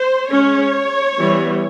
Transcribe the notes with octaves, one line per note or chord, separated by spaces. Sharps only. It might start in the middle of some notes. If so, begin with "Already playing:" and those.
Already playing: C5
G#3 C#4 C#5
E3 G3 B3